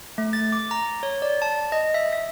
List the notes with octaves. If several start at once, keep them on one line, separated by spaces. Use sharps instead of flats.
A3
A6
D6
A#5
C#5
D5
A5
D#5
E5
E5